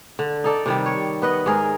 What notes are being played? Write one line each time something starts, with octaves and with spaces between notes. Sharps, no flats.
D3
D#4 A4 D5
C3 D#3 G3
C#5
B3 B4 D#5
G#2 G#4 A#4